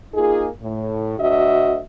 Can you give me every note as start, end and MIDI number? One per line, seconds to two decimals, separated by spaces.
0.14 0.46 58
0.14 0.46 63
0.14 0.46 65
0.14 0.46 68
0.62 1.16 45
1.19 1.78 38
1.19 1.78 50
1.19 1.78 66
1.19 1.78 75
1.19 1.78 76